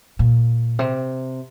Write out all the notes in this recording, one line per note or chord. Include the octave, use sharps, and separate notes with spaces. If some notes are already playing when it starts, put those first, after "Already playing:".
A#2
C3